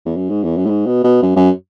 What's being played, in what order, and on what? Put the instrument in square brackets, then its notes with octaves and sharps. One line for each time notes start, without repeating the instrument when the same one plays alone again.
[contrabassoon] E2
F#2
G#2
E2
F#2
A2
G#2
B2
B2
F#2
F#2